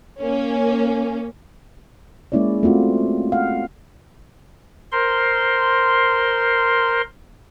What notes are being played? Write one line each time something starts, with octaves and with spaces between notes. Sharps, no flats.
A#3 C#4
G#3 A#3 C#4 E4 C#5 D5
A3 C4 F4 F#4
F5 F#5
A#4 C5 C6